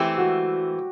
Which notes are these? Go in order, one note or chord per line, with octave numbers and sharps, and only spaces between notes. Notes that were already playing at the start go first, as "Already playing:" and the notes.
Already playing: E3 A3 C4 G4
F#4